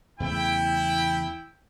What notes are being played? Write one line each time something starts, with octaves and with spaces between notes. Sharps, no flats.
E2 C#3 A3 E4 G5